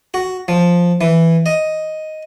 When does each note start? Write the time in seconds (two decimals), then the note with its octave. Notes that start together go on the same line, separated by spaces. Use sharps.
0.14 F#4
0.48 F3
1.01 E3
1.46 D#5